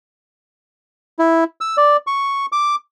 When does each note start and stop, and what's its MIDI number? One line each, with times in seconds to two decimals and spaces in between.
1.19 1.44 64
1.61 1.77 88
1.77 1.97 74
2.07 2.46 85
2.52 2.75 86